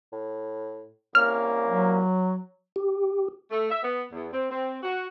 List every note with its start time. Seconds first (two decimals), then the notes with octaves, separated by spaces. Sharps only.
0.12 A2
1.15 C2 A#3 C#4 F6
1.67 F#3
2.76 G4
3.51 A3
3.70 E5
3.83 B3
4.12 E2
4.32 C4
4.50 C4
4.83 F#4